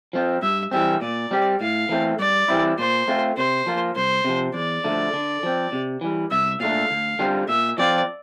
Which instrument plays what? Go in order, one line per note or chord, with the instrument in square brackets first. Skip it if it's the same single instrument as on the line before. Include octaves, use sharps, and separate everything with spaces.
[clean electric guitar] F3 C4 F4
[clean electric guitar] G2 [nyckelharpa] E5
[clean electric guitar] E3 G3 C4 [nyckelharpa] E5
[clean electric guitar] A#2 [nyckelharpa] D5
[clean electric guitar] G3 C4 G4
[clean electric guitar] A2 [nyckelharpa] F5
[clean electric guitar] E3 A3 C4
[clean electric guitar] G2 [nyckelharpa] D5
[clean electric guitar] E3 G3 C4 E4
[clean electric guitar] A#2 [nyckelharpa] C5
[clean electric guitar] A3 C4 F4
[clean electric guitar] C3 [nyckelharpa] C5
[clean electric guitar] F3 A#3 F4
[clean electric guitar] C2 [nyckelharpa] C5
[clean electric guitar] C3 F3
[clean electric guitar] E2 [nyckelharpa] D5
[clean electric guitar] D3 F3 A3
D3
F3 C4
C3
E3 G3
[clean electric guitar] C2 [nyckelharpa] E5
[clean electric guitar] A#2 A3 D4 [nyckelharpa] F5
[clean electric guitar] D2
D3 G3 C4 F4
[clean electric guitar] A#2 [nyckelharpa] E5
[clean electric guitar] F3 C4 F4 [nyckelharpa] D5